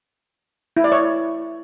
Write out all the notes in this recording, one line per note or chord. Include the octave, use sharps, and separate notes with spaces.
E4
D5
C#5